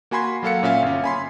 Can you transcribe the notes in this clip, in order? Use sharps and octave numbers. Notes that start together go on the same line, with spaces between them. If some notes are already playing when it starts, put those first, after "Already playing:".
A#3 F#4 G#5 B5 C6 G#6
F#3 A#3 A4 F5 F#5 C#7
A#2 C#4 E5 F5
G1 C#4
G#5 B5 C6